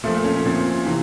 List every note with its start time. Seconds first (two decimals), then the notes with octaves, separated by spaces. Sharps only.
0.04 A#2 A3
0.07 F3
0.14 A3
0.24 C#4
0.35 C#4
0.45 A#2 F3 C4
0.86 C3 E3